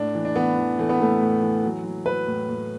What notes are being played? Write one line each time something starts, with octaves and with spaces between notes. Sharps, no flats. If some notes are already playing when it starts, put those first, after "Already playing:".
Already playing: A2 D4
E3
D4
E3 B3
E3
E3 A3
B3
A2 A3
A2
E3
F#3
F#3
F#3 B4
A2
A2